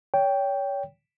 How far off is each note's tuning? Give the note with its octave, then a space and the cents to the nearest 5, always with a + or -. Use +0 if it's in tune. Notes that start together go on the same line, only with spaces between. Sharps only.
C#5 +30 G5 +0